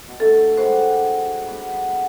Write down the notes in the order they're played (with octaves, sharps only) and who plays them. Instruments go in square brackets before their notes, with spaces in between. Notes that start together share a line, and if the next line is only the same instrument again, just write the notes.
[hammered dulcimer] B2
[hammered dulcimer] A3 D4 G#5 [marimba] A4
[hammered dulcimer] G3 G#3 F#4 [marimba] C5
[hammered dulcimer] B3 D5 B5